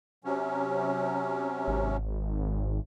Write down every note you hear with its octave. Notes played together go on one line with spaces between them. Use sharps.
C3 F#3 C#4
G#1